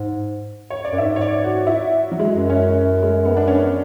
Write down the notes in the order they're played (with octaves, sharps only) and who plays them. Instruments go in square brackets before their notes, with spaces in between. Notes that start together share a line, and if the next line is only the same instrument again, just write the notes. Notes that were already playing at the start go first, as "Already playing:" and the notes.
Already playing: [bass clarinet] G#2
[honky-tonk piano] C#5
D5
[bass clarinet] F#2
[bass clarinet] G#2 [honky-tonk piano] E5
[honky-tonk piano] C#5
D5
F#4
E4
F#3
G#3
[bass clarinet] F#2
[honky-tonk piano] C#4
G#3
B3
D4
C#4